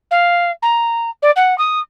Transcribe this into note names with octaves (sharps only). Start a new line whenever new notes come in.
F5
A#5
D5
F#5
D#6